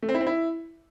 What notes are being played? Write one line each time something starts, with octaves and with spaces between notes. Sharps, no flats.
A3
C4
E4
C4
E4